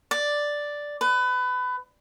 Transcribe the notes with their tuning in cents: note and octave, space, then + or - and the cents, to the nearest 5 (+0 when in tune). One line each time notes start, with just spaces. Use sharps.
D5 +0
B4 +25